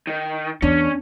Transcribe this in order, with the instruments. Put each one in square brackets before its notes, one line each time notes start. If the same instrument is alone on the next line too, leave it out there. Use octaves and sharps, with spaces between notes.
[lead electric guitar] D#3
[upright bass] E2 [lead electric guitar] C#4 [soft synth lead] D4